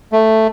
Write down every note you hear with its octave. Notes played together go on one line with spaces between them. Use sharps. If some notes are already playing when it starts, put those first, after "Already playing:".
A3